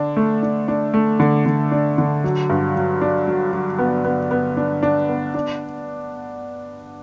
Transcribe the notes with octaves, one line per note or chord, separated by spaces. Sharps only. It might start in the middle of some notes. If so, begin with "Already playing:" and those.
Already playing: D3 D4
A3
D4
D4
A3
D3
D3
D4
D3
F#3
G2
F#3
D4
F#3
F#3
B3
B3
B3
D4
D4
B3
D4